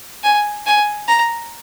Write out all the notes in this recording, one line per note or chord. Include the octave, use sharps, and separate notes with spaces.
G#5
G#5
A#5